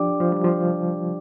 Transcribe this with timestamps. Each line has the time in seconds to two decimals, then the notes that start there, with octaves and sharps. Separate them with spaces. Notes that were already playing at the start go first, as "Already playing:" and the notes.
Already playing: F3 D4 G4 D5 G5 D6
0.20 F3
0.32 G3
0.44 F3